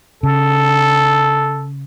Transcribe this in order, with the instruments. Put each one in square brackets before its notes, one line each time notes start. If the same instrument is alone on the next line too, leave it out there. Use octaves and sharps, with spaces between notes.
[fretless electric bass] C#3 [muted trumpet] A4